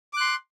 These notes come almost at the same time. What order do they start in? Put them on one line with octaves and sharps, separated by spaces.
D6 F#6 C6